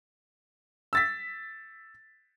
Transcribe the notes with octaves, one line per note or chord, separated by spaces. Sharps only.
E6 A6 B6